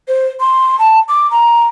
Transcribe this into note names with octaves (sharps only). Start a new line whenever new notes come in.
C5
C6
A5
D6
A#5